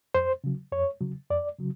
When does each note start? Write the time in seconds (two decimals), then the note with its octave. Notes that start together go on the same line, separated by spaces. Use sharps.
0.14 F2 C5
0.44 C#3 F#3
0.72 F2 C#5
1.01 C#3 F#3
1.30 F2 D5
1.59 C#3 F#3